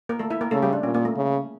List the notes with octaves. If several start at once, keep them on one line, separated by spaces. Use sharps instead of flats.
A#3 A#4
A3 A4
E4 E5
A#3 A#4
C#3 A3 A4
G3 G4
D4
A#2 C#4
A#3
A3
C#3